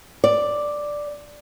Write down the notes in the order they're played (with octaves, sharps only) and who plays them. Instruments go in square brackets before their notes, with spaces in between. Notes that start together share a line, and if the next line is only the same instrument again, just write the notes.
[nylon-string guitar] D5